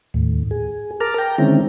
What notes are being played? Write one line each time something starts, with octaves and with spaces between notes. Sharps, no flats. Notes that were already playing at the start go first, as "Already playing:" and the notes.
D#2 A2
G#4
A#4 A5 A#5 D6 F6
G5 A#5
D3 D#3 G#3 C4 C#4 E4